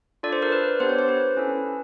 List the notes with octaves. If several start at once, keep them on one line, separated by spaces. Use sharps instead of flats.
D4 F4 A4 D5
C5
A#4
B4
B3 D4 G4 C5
C#5
C5
B4
C#4 E4 A4